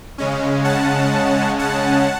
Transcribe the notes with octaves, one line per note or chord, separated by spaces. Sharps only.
C#3 G#3 C#4
F#5 A5
F#5 A5